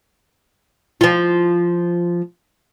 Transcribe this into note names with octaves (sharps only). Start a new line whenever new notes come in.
F3 F4